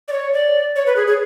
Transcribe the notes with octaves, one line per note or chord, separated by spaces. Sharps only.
D5
C#5
D5
C#5
B4
G#4
G#4